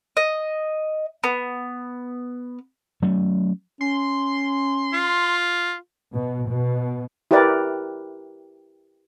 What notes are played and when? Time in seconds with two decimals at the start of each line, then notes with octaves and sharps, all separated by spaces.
0.17 D#5
1.24 B3
3.02 F#3 A3 C#4
3.81 C#4 C6
4.93 F4
6.13 B2
6.49 B2
7.31 E4 G4 A#4 B4 D5